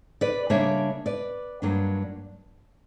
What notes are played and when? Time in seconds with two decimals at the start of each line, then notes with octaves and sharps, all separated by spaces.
0.21 B4 D5
0.50 C#3 G3 A#3 D4 C#5 E5
1.06 B4 D5
1.62 G2 F#3 A#3 D4